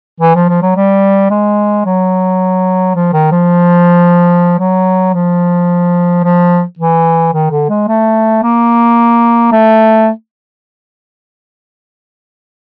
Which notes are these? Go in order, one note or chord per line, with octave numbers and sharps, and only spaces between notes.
E3
F3
F3
F#3
G3
G#3
F#3
F3
D#3
F3
F#3
F3
F3
E3
D#3
D3
G#3
A3
A#3
A3